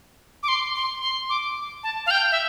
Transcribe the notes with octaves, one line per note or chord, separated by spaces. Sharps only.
D6
C6
C6
C6
D6
A5
F5
G5
E5